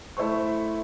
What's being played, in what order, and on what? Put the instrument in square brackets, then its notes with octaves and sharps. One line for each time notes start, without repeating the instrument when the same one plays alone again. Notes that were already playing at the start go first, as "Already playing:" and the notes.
[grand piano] A3 E4 A4 C5 C#6